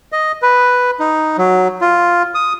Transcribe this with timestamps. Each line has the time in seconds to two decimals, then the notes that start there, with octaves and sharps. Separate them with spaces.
0.12 D#5
0.42 B4
1.00 D#4
1.38 F#3
1.81 F4
2.35 D#6